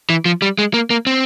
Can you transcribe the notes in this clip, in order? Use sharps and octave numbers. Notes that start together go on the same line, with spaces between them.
E3
F3
G3
G#3
A#3
A#3
C4